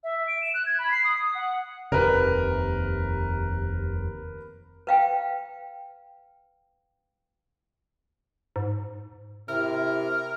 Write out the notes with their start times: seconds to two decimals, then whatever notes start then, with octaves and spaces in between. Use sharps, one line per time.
0.04 E5
0.28 D7
0.42 E7
0.54 F#6
0.66 G#6
0.79 B5
0.92 C7
1.04 D#6
1.17 D#6
1.35 F#5
1.92 F1 D#2 C3 A#4 B4
4.87 B4 F5 G5
8.56 G#2
9.49 C3 E4 A#4